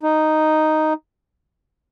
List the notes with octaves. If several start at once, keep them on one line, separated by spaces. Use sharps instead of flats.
D#4